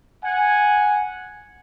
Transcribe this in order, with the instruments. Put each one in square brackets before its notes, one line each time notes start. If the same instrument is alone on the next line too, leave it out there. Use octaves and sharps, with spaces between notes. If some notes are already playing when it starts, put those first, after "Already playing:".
[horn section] F#5 G#5